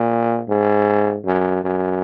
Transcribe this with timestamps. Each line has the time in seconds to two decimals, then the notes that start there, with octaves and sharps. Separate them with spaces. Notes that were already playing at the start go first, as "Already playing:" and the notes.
Already playing: A#2
0.49 G#2
1.26 F#2
1.64 F#2